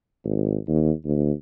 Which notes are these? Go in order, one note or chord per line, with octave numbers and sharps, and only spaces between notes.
G#1
D#2
D2